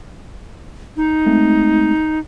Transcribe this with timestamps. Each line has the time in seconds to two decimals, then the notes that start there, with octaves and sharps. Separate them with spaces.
0.97 D#4
1.26 G#3 A3 C4